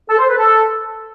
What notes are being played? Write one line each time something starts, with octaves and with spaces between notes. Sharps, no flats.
A4
C5
B4
A4